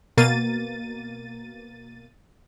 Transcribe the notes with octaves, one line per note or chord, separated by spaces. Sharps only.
B2 A#3 A6 D#7